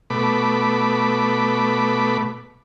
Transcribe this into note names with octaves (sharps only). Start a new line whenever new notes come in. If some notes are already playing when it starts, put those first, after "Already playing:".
B2 A3 B5 D6